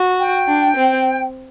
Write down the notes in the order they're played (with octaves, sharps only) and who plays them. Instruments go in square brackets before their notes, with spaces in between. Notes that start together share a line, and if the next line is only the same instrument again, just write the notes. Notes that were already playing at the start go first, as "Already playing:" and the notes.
Already playing: [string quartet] F#4
[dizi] G5
[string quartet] D4
C4